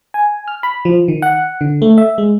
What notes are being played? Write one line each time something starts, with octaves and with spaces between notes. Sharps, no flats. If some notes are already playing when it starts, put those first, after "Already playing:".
G#5
F6
B5
F3
D#3
F#5
D3
A3
E5
G#3